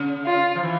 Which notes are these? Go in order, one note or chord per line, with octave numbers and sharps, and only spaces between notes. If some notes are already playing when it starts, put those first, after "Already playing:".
Already playing: C#3
F4
F3
E3